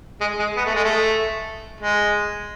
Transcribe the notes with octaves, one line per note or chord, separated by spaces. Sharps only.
G#3
G#3
B3
A3
G#3
A3
G#3